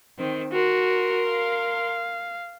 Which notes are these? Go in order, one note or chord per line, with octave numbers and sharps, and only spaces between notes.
D#3 C4
F#4 A#4 C6
F5